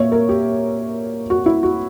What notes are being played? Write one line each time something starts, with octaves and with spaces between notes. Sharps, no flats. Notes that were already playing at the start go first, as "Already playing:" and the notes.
Already playing: A#2 A#3 C#5 E5
A#4
G4
F#4
E4
F#4